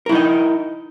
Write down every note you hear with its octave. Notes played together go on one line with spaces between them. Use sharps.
D#4 E4 A#4 D#5